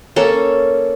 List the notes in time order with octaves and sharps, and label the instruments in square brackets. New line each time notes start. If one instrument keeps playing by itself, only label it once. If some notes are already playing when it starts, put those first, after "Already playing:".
[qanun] A#3 C#4 A4